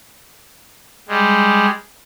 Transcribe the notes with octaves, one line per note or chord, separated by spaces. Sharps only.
G3 G#3